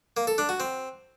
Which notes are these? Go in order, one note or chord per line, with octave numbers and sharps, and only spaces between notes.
A#3
A4
D4
F#4
C4